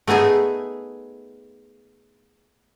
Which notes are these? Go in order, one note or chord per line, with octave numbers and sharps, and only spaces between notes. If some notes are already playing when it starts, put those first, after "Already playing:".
A3 B3 D#4 G#4 E5